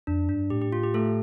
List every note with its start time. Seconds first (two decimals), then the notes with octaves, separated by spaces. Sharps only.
0.07 F2 D4
0.29 G2 D4
0.50 A2 G4
0.62 G4
0.73 F4
0.83 G4
0.94 A3 A4